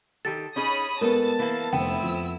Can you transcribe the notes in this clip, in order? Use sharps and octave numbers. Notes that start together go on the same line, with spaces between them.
D#3 G4 A4 A6
C#4 D#4 G#4 C#5 B5 D#6
A2 G#3 B3 A4 A#4 A5
E3 A#3 B3
F1 B3 C4 E4 G5 E6
F2